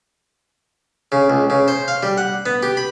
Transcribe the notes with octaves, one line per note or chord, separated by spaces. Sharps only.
C#3
C#2
C#3
C5
F5
G3
F#5
B3
G4
B5